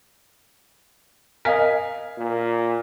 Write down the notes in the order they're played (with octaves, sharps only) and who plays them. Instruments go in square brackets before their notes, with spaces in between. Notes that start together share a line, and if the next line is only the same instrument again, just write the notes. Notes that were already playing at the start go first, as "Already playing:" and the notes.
[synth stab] A#4 D#5 [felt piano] F5 G#5 B6
[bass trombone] A#2